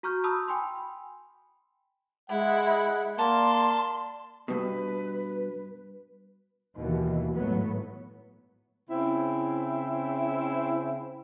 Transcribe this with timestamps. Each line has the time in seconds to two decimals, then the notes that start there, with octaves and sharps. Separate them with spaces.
0.03 F#4 A#5 C#6 F6 G6
0.24 A5 B5 D#6 E6
0.48 G5 G#5 B5 C6
2.30 G#3 E4 F#5
3.18 A#3 D5 A5 C6
4.48 G2 B2 B4
6.76 D#2 B2 E3
7.35 G#1 A2 F#3 B3
8.90 C#3 C4 E4